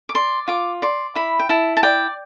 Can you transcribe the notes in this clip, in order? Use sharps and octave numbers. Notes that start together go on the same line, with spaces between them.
D6
D5 C6
F4 D6
D5 C6
E4 B5
G5
E4 A5
A5
D5 G5